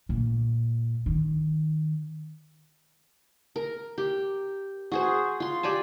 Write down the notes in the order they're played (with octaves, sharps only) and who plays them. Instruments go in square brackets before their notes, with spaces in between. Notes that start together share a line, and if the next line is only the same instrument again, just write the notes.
[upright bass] A#2
D#3
[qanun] A#4
G4
F#4 G#4 C5
F4 C6
G4 D5 G#5 A5